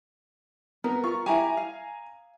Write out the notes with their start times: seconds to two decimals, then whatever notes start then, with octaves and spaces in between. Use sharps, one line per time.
0.84 B3 A#4
1.04 F4 A#4 C#6
1.26 E4 G4 G#5 A#5
1.57 F5